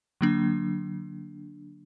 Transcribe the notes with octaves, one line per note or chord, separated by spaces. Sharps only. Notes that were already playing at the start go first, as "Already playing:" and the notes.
D3 F#3 A#3 D4